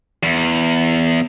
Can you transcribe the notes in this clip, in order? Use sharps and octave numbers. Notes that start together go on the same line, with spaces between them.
E2